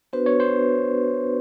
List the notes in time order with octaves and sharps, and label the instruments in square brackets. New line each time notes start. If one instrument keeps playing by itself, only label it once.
[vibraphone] B3 D4 F#4 B4 [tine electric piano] C5
[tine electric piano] C#5
C5